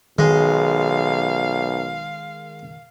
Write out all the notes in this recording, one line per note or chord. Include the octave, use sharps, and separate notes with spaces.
B1 D#3 G#3 F5